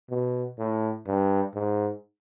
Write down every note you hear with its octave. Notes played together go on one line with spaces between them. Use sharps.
B2
A2
G2
G#2